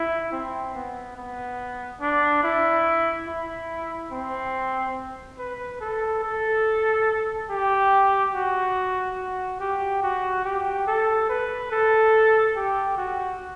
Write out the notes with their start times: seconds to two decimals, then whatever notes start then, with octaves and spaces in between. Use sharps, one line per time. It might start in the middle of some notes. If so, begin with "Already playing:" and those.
Already playing: E4
0.32 C4
0.75 B3
1.17 B3
2.01 D4
2.44 E4
3.28 E4
4.12 C4
5.39 B4
5.81 A4
6.23 A4
7.50 G4
8.34 F#4
9.18 F#4
9.60 G4
10.03 F#4
10.45 G4
10.87 A4
11.30 B4
11.72 A4
12.56 G4
12.98 F#4